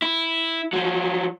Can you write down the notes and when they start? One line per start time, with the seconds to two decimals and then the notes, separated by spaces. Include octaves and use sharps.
0.02 E4
0.73 F3 F#3